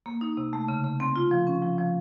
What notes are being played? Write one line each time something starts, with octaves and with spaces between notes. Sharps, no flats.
A#3
D#4
C3
A3
C#3
C#3
C4
F4
F3
C#4
F3
F3